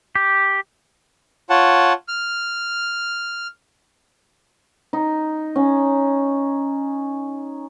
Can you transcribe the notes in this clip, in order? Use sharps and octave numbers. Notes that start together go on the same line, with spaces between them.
G4
F4 C#5 F#5 A5
F6
D#4
C#4